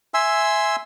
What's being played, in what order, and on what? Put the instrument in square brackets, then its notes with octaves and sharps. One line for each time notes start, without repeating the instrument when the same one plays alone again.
[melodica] E5 G#5 C6 E6